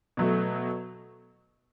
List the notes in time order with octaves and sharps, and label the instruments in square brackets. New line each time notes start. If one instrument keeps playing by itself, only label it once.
[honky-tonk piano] B2 F#3 A3